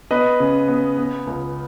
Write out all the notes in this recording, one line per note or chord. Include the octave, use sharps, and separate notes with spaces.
B3 B4 D#5
C#3
B3
B3
C#2